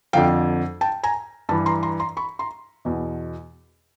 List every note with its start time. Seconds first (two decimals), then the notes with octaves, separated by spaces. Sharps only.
0.13 F2 D3 F3 F5 G5
0.81 G5 A5
1.03 G#5 A#5
1.49 G2 E3 A5 B5
1.66 A#5 C6
1.83 A#5 C6
2.00 A#5 C6
2.17 B5 C#6
2.39 A#5 C6
2.85 E2 B2